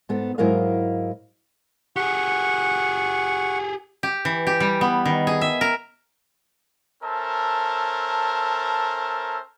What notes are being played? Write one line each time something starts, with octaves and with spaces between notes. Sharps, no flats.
G#2 B3 A4
G#2 F#3 E4 A#4 D#5 F5
G4 G#4 F#5 C#6
G4
E3
G4
G3
B3
D#3
G#4
E5
A#4
C#4 A4 A#4 C5 E5 A5